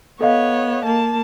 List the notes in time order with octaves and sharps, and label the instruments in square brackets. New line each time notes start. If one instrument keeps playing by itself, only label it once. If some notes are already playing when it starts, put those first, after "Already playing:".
[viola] B3 C#5 [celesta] A4 D#5 F5
[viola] A#3 A5